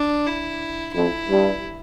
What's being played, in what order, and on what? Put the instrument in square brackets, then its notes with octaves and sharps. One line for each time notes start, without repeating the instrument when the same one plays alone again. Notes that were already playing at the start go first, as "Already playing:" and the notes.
Already playing: [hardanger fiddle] D4
E4
[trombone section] F2 [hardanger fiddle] E4
[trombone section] G2